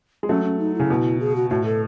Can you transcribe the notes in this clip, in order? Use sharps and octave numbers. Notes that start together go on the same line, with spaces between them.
G#3
F#3 A3 C#4
C#4
D#4
C#3 E4
B2
G#4
F#4
A2 F#4
A4